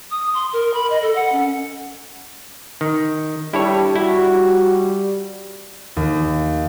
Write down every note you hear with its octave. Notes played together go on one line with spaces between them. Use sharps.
D#6
C6
A#4
B5
D#5
A4
F#5
C#4
D#3
G3 D4 E4 A4 C#5
G3 E4 F#4
D#2